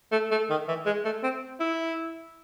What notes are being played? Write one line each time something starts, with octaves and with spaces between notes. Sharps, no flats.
A3
A3
D#3
E3
G#3
A3
C4
E4